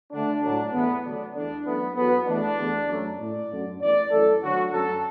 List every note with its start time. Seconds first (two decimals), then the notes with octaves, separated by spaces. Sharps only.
0.12 D2 D3 A3 D4
0.42 A2 F#3 A3 D4
0.73 E2 E3 A3 B3
1.03 D2 D3 F#3 A3 D4
1.34 E2 E3 A3 D4
1.65 F#2 E3 A3 B3
1.95 E2 D3 F#3 B3
2.27 E2 B2 A3 D4
2.58 E2 D3 A3
2.88 F#2 F#3 A3
3.19 A2 A3 D5
3.50 F#2 D3 A3
3.80 E2 E3 A3 D5
4.10 F#2 E3 A3 A4
4.42 D2 D3 F#3 F#4
4.72 F#2 F#3 A3 A4